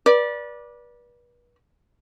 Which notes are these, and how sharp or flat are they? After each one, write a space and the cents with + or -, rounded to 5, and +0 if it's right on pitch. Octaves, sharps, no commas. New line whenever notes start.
B4 -35 D5 +0